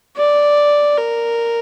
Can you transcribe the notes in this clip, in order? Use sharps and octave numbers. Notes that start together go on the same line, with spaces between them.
D5
A#4